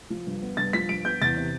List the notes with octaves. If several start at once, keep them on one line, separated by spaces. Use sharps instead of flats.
F3
G2
B3
G2 A6
F3 B6
G2 D7
B3 G6
E2 A6
C3